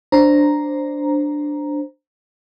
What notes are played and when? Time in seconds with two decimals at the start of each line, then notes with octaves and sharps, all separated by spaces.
0.12 D4 C5 A#5